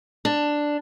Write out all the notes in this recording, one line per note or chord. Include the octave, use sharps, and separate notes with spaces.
D4